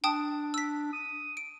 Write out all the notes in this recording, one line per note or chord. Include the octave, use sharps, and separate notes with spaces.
D4 G5 A5 D#6
E6 B6
D#6
D7